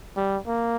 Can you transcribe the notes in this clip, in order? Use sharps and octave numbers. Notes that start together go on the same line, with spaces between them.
G3
A#3